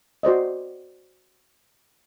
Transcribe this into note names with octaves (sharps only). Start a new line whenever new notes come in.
F#4 C5 D5 D#5